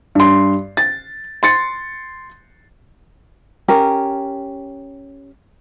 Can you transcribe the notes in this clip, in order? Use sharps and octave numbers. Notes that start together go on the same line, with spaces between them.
G2 C6
A6
C6 A6 C#7
C#4 G4 A#4